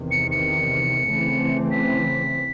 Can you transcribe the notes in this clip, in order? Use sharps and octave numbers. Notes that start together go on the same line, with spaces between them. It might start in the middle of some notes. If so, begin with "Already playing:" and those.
Already playing: E2 C3 D#3
C#7
C#7
C#3 E3 A3 C4
B6